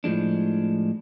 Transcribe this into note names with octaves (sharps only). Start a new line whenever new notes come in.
A2 F3 G#3 D4